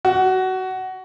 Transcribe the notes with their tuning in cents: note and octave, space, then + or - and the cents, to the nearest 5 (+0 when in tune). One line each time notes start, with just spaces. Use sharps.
F#4 +20